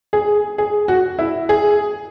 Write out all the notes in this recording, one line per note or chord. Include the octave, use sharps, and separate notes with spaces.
G#4
G#4
F#4
E4
G#4